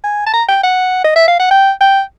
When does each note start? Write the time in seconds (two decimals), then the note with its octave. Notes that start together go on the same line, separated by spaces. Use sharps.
0.04 G#5
0.26 A5
0.33 A#5
0.49 G5
0.63 F#5
1.05 D#5
1.16 E5
1.28 F5
1.40 F#5
1.51 G5
1.81 G5